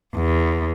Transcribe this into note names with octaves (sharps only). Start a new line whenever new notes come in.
E2